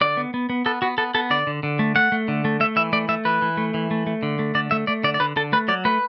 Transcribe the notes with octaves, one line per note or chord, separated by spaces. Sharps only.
D3 D5
B3
B3
B3
B3 A4
B3 F#4
B3 A4
B3 A4
D3 D5
D3
D3
A3
A3 F#5
A3
D3
A3
A3 E5
E3 E5
A3 D5
A3 E5
E3 B4
E3
A3
E3
A3
A3
D3
A3
D3 D5
A3 E5
A3 D5
D3 D5
D5
D3 B4
D3 A4
A3 B4
F#3 D5
A3 B4